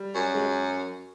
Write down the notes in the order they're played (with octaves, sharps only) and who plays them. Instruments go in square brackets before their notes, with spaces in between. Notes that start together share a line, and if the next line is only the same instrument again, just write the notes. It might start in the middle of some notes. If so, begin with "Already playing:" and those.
Already playing: [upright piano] G3
[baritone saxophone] F#2
[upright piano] G#3